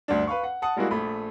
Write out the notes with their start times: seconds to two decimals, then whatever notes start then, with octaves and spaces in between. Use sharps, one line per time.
0.08 D2 G2 D4
0.27 B4 F5 C#6
0.44 F#5
0.62 F#5 A5 D#6
0.76 G3 G#3 A#3 E4 F#4
0.91 A#1 A3 B5